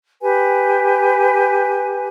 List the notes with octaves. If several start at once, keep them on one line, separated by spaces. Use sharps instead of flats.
G4 B4 G#5